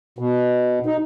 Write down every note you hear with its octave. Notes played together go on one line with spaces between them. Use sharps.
B2
D#4